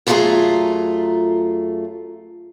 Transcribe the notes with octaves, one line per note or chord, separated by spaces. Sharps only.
F#2 G3 A3 F4 G#4 A#5